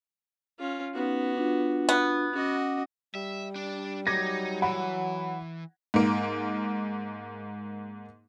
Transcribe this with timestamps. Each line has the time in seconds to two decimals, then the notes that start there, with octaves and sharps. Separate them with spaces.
0.59 C#4 F4
0.94 B3 C#4 D#4 F#4
1.37 D4 F4
1.89 B3
2.33 C#4 F#4 D#5 F#5 D6
3.15 G3 E5
3.56 D4
4.07 F#3 D#4 D6 G#6 A#6
4.62 E3 F#5 B5
5.94 G#2 A#3